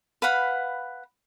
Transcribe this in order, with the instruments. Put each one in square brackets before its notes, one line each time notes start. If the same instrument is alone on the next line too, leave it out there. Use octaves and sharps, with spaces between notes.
[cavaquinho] B4 F5 F#5 B5